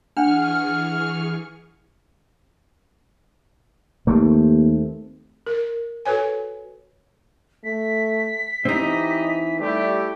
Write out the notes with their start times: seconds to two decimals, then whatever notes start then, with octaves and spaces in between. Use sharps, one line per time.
0.17 E3 D4 G#4 F#5 C#6 F6
4.07 D#2 A3 A#3 C4
5.47 A#4
6.05 F#4 A4 B4 C#5 G#5
7.64 A3 B6
8.65 E3 C4 D#4 G4 D#5
9.61 G3 A3 E4 G4